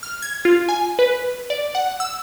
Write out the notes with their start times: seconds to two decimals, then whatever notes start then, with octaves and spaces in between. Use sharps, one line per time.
0.03 F6
0.22 G#6
0.45 F4
0.69 G#5
0.99 B4
1.50 D5
1.75 F#5
2.00 E6